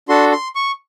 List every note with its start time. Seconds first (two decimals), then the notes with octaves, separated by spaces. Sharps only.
0.09 D4 F#4 A4 C6
0.32 C6
0.55 C#6